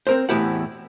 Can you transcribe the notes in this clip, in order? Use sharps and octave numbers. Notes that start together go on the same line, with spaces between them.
C4 A#4 C5
E2 A2 E4 G4 F#5